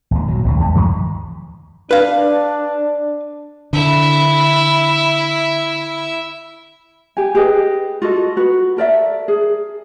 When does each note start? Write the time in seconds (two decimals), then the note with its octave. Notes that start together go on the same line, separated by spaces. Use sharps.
0.11 G#1 D#2
0.28 A#2 F#3
0.44 G#1 D2 C3
0.60 D#2 G#3
0.75 G2 D#3 F3 G#3
1.91 D4 B4 F5
3.73 D3 E4 E5
7.17 G4 G#5
7.35 G4 G#4 B4 D#5
8.02 F4 F#4 A4 D#5
8.37 F#4 B4
8.77 A4 A#4 D5 E5
9.28 G#4